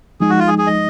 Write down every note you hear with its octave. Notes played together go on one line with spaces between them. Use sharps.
F3 G#3 D#4 G#4
F#4
F4
G#4
G#4
D#5